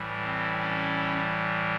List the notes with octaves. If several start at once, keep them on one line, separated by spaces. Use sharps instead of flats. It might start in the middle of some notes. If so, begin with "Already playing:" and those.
Already playing: A2 E3 G3
C4
C#4